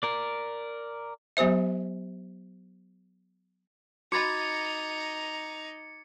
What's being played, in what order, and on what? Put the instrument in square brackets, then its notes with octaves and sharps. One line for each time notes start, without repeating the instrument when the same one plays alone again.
[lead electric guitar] A#4 D5
[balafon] F#3 B3 G4 C5 E5
[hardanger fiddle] D#4 A#5 [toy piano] F#4 B5 [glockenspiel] D6 G#6 A6 [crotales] C#7